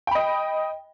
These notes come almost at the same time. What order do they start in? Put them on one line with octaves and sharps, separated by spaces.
G5 B5 D#5